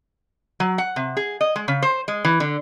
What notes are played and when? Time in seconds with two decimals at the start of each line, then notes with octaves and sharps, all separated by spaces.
0.60 F#3
0.78 F#5
0.96 C3
1.17 G#4
1.41 D#5
1.56 G#3
1.68 C#3
1.82 C5
2.08 G#3
2.25 E3
2.40 D3